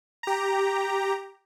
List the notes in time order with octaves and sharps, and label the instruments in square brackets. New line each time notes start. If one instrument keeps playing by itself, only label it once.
[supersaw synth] G4 A#5